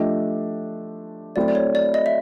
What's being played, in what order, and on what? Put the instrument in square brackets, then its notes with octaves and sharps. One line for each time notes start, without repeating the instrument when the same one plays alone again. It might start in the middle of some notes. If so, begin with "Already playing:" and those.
Already playing: [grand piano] F3 A3 D4 G4 [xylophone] D#5
[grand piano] F#3 A3 C4 E4 A4 [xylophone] D5
[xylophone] D5
C#5
D5
D#5
E5